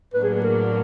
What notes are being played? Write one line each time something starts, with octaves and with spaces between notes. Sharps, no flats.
A2 F#3 A#3 D4 B4
G#4
G#4
A#4